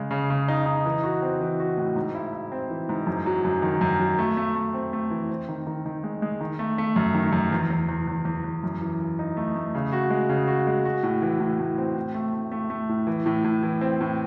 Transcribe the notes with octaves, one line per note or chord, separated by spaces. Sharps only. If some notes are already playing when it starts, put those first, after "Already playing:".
Already playing: C#3 G#3
C#3
C#3
D#4
D#4
E3
F#4
C4
E3
F#4
A2
G#2
E4
E4
C4
E3
G#2
F#2
F#3
F#2
D#3
F#2
F#3
A3
A3
A3
C4
A3
E3
C4
D#3
D#3
D#3
G#3
G#3
D#3
A3
A3
F#2
D#3
F#2
E2
E2
E2
E2
E2
E2
F#2
E3
E3
D#4
A3
A3
C#3
F#4
G#3
C#3
F#4
G#3
F#4
A2
E3
A2
A2
C4
A2
A3
A3
A3
A3
A2
E3
A2
A2
E3
C4
A2